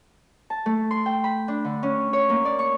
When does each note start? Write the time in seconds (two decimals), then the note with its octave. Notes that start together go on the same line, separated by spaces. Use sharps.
0.50 A5
0.66 A3
0.91 C6
1.06 G5
1.24 B5
1.48 D4
1.65 D3
1.83 C#4
2.13 C#5
2.29 A#3
2.45 D5
2.59 C#6